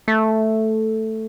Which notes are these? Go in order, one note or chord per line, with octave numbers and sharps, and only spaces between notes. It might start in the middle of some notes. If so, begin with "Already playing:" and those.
A3